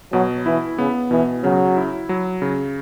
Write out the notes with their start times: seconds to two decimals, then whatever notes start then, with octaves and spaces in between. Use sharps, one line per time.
0.13 B2 F#3
0.46 E3 E4
0.78 C#3 B3
1.11 B2 E3
1.44 C#3 F#3
1.77 E4
2.09 F#3
2.42 C#3